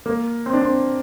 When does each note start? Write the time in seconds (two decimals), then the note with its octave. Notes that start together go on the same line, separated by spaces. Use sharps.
0.06 A#3
0.46 C4
0.53 D4
0.61 C4